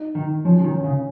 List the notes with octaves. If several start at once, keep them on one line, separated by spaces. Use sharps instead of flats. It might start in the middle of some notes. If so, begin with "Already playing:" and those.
Already playing: D#4
D#3 D#4
F3 C#4
F3
D#3
C#4
C#3